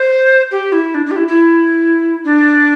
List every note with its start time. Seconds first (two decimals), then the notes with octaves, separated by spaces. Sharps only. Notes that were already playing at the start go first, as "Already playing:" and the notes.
Already playing: C5
0.51 G4
0.72 E4
0.95 D4
1.06 D4
1.11 G4
1.16 E4
1.28 E4
2.25 D4